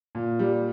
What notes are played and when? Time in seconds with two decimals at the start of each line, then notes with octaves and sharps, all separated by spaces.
0.15 A#2
0.39 G3